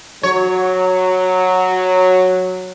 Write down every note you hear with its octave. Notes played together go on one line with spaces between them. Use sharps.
F#3 C#5